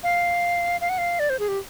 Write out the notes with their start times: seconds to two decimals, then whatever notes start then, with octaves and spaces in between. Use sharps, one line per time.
0.03 F5
0.81 F5
0.89 F#5
0.98 F5
1.19 D5
1.30 C5
1.39 G#4
1.48 G4